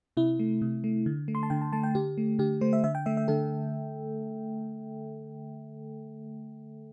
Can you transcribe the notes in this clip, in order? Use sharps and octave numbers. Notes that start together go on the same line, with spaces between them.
C3 E4
A3
C3
A3
D3
A3
C6
A5
D3 G5
A5
A3 A5
G5
D3 G4
A3
D3 G4
A3 C5
E5
D3 E5
G5
A3 E5
E5
D3 A4